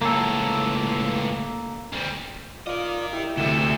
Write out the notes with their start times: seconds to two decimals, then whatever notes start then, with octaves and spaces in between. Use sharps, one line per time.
0.02 C#2 A2 A#3 A4
1.92 D2 G3
2.67 F4 A#4 D5 D#5
3.13 E4 G4
3.37 D2 C3 A3 E7